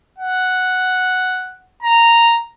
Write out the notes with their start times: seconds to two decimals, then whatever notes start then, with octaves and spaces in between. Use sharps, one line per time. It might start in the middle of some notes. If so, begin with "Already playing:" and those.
0.18 F#5
1.82 A#5